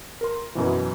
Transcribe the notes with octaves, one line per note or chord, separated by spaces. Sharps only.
A#4 C6
F#2 B2 E3